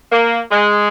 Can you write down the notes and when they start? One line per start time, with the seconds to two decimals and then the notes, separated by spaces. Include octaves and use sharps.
0.12 A#3
0.52 G#3